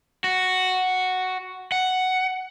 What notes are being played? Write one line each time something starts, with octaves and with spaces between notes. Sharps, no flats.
F#4
F#5